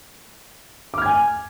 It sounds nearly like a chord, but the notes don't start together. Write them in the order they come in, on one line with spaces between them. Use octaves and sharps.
D6 F6 G#6 G#5